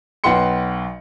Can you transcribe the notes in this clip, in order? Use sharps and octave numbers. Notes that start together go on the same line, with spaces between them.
B1 B4 F#5 G5 C6 C#7